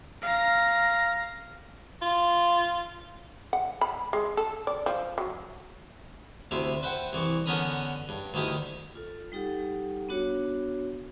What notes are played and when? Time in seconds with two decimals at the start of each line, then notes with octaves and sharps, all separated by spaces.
0.22 F5 A#5
2.02 F4
3.53 F#5
3.81 B5
4.13 G#3
4.37 A4
4.67 D5
4.86 F3
5.18 F#3
6.51 D2 C3 E4 E5 D6
6.83 B4 C5 E5 F#5 G5
7.13 C2 E3 C#6 D6
7.46 D3 B3 C#4 A#4 B5 D#6
8.09 G2
8.34 D2 D#3 E4 G4 D6 D#6
8.95 F4 A4
9.32 G3 D#4 G4 A4 F#5
10.09 B3 D4 F#4 C#5